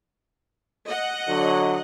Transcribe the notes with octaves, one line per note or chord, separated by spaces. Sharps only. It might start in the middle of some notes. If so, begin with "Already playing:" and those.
D#5 F#5
D3 F#3